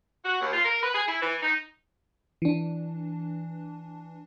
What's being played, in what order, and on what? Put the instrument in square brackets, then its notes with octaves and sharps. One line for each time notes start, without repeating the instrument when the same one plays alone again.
[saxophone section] F#4
D#2
F4
A#4
B4
G#4
E4
E3
D#4
[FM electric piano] E3 D4